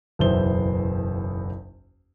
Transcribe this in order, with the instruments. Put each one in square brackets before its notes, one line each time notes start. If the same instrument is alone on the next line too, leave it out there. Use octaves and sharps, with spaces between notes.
[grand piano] F#1 B1 E2 C5 E5 G7